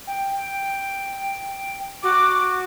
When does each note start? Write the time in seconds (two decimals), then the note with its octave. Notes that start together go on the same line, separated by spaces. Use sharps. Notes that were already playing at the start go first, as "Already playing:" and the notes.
0.07 G5
2.03 F#4 D6